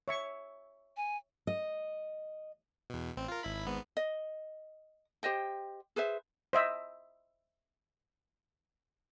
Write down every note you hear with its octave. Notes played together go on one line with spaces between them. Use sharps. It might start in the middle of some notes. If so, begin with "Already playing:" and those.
C#5 E5 C#6
G#5
D#5
E2 B2
A1 C4
F4 A#4
G#1 E4 B5
G#1 G#2 B3
D#5
G4 C5 D#5 G5
G#4 B4 C5 E5
C5 D#5 E5